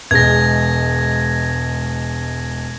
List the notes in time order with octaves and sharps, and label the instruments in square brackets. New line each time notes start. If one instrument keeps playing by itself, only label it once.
[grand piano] E1 G#3 [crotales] G#6 A#6